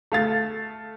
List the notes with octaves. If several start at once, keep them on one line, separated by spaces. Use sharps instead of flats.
A3 F5 A6